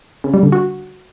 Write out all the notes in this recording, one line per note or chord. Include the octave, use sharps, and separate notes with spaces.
C#3
G3
D3
F#4